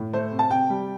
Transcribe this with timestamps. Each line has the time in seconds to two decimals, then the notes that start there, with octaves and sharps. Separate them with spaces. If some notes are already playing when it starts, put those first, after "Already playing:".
Already playing: A2
0.13 A3 C5
0.32 C3
0.39 A5
0.50 C3 G5
0.70 G3